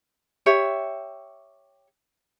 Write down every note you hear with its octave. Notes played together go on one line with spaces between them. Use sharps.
G4 C#5 E5